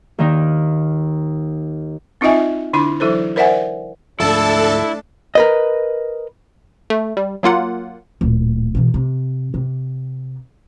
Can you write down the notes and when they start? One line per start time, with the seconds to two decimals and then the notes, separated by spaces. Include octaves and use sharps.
0.19 D#2 D#3 D#4
2.21 C4 D#4 F4 D#5 E5 G#5
2.73 D3 D4 E4 B5
3.00 E3 F#3 E4 A4 C5
3.36 A#4 C5 D5 E5 F#5 G#5
4.20 D2 G#2 F3 A3 D4 E4 A4 A5
5.35 A#4 B4 D#5
6.90 A3
7.17 G3
7.43 F#3 A#3 F4 F#5
8.21 D1 A#2
8.75 B2 E3
8.94 C3
9.54 C3